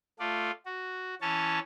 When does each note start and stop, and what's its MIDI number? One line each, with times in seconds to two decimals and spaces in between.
0.19 0.51 57
0.19 0.51 65
0.19 0.51 74
0.66 1.15 66
1.21 1.59 52
1.21 1.59 61
1.21 1.59 73
1.21 1.59 81